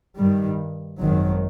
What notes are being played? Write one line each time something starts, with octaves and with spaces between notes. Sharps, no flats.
G2 D#3 G3
G#1 F#2 D#3 F#3